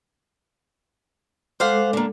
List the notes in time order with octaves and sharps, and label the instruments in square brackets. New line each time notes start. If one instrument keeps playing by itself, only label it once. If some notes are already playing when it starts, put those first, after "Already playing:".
[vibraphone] G#3 A4 D6 [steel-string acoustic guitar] C5 F5 F#5
[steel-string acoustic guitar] D3 A#3